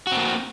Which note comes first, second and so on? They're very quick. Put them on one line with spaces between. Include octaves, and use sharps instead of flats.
F#4 C4 A#3